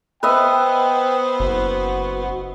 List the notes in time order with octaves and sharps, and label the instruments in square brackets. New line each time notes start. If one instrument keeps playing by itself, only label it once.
[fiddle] B3 C5 [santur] B4 D#5 E5 [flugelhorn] G5
[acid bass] F#1 [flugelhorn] F#4